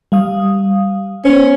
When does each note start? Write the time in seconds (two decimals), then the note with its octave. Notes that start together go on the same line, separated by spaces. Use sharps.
0.12 G3 F5 D#6
1.25 B3 C#4 C5